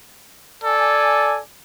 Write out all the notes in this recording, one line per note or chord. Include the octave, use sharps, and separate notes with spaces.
A4 D5 G#5